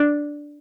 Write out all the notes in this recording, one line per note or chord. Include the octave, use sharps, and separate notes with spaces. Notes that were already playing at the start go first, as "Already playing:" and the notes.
Already playing: D4